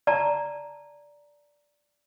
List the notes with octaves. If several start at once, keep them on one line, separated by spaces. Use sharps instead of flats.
D5 A5 A#5